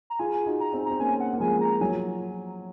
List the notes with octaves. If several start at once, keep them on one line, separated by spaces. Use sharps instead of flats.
A#5
F4 G#4 G#5
D#4 F#4
A#5
C4 D#4
C4 A#5
A#3 C#4 G#5
F#5
A#3
F3 G#3 G#5
A#5
F#3 G#5
F3